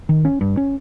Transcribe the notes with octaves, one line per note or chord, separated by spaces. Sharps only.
D#3
C#4
G2
C#4